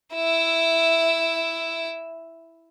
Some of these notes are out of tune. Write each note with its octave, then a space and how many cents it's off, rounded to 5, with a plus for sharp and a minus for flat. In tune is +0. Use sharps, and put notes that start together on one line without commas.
E4 +5 E5 +0